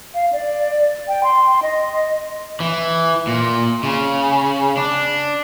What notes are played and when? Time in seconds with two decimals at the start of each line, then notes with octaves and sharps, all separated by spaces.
0.14 F5
0.33 D5
1.08 G5
1.24 C6
1.62 D#5
2.60 E3
3.27 A#2
3.83 C#3
4.77 D4